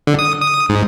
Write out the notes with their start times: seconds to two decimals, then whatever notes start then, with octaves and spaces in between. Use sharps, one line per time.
0.07 D3
0.19 D#6
0.41 D#6
0.69 G#2